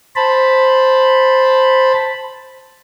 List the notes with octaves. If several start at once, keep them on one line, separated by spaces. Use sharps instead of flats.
C5 A5 B5